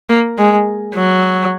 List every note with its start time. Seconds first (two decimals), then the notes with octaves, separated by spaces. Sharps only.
0.09 A#3
0.38 G#3
0.94 F#3